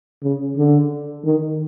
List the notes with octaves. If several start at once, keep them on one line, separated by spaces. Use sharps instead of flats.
C#3
D3
D#3